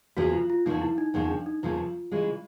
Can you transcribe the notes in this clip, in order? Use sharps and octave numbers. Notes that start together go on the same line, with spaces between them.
E2 C#3 F3 A#3 F#4
F4
F4
E2 C#3 F3 A#3 D#4
E4
D#4
E2 C#3 F3 A#3 D#4
D4
D#4
E2 C#3 F3 A#3 F4
C#3 E3 G#3